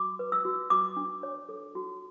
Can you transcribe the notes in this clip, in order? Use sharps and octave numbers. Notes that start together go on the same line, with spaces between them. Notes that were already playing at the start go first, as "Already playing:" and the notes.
Already playing: F#4 D6
B4
E6
F#4
F#4 D6
D4
C#5
A4
F#4